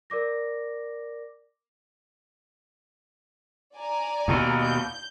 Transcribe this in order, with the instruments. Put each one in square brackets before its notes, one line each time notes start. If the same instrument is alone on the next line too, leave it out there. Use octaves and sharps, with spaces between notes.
[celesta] A#4 D5 D6 A#6
[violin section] D5 G#5 A#5
[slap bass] D#2 B2
[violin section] G6